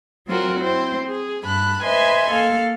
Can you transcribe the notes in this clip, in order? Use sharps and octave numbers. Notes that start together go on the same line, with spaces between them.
F#3 C4 F4 F#4 A#4
C4 E4 C5
G#4
G2 A5 B5 F#6
B4 C5 D#5 E5 G#5 C6
A#3 A4 F5